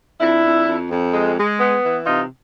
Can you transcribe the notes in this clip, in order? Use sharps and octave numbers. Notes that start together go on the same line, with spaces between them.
F2 D4 E4
F2
F2
F2
G#3
G#3
B3
E3
C3 D#4 F4